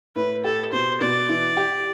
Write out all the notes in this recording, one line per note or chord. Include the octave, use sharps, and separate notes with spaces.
A2 B4
G4 A4
B2 C5
B2 D5
E3
G4